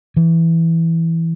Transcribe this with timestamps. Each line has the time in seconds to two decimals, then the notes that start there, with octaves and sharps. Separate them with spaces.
0.16 E3